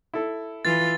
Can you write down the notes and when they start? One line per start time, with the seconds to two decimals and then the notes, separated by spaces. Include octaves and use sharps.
0.14 E4 A4
0.65 E3 F4 A6